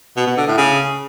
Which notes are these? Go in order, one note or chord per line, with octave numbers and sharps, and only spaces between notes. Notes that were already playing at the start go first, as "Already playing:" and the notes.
B2
B2
D3
A2
C#3